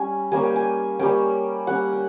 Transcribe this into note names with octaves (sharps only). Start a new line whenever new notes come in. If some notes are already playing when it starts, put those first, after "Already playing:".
Already playing: G3 C#4 G#5
G3 A#3 C#4 G#5
G5
G#5
G3 A#3 C#4 G5
G3 A#3 C#4 F#5
G5